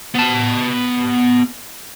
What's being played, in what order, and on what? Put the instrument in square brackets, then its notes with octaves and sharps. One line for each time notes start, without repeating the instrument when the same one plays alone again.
[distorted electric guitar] B3 A5